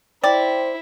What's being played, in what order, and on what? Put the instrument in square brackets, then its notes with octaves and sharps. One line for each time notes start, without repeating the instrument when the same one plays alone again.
[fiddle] E4 [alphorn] C5 [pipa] D5 [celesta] G5